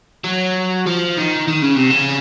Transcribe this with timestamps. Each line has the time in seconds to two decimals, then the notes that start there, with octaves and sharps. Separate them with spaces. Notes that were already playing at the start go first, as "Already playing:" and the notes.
0.24 F#3
0.86 F3
1.17 D#3
1.48 D#3
1.62 C#3
1.76 C3
1.90 C#3